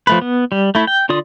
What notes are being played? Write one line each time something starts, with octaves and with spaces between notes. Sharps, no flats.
F3 A3 B4
B3
G3
A3 E4
G5
D3 F4 D5 D#6